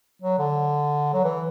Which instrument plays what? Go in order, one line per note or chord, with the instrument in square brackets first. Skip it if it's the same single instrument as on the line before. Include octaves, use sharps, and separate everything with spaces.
[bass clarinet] F#3
D3
F#3
E3